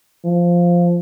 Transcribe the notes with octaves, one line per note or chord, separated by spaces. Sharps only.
F3